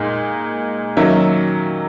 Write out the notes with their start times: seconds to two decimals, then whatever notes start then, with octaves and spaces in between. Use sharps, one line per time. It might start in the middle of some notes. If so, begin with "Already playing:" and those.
Already playing: A#2 G#3 D#4
0.97 D#3 F#3 A#3 C#4 E5